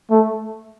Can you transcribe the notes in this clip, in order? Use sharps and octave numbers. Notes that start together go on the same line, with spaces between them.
A3